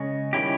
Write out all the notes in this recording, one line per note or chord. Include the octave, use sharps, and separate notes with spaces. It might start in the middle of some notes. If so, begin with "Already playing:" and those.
Already playing: C#3 G#3 C#4
D#3 G3 C#4 E4 G4